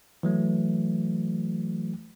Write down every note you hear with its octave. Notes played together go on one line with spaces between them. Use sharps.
E3 F#3 A3